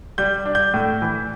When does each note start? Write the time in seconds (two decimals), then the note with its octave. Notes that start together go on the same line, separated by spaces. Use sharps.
0.18 G3 G6
0.45 D4
0.55 G6
0.74 A2
1.02 E3